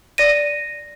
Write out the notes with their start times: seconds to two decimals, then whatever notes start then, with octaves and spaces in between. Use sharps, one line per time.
0.18 D5 A#6 D#7